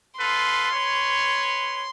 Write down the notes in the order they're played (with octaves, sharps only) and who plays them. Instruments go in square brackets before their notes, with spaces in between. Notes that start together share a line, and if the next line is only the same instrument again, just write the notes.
[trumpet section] F4 A4 B4 [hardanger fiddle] C6
[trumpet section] B4 C#5